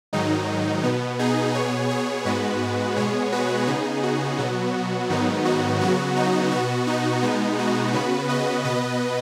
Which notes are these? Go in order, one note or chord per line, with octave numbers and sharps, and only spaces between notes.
G#2 D#3 F#3 D#4
B2 B3
D#4 G#4
B2 B3 G#4 C#5
G#4 C#5
G#2 G#3 B3 F#4 B4
B2 G#3 B3 G#4 C#5
F#4 B4
C#3 B3 D#4 G#4
F#4
B2 F#3 B3
G#2 D#3 F#3 B3 D#4
F#4
C#3 F#3 B3 F#4
D#4
B2 B3 F#4
D#4
B2 G#3 B3
F#4
C#3 B3 F#4 B4
B4 D#5
B2 B3 B4 D#5